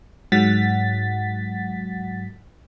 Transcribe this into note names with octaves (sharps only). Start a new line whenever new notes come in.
G#2 F#3 F#5 A6 B6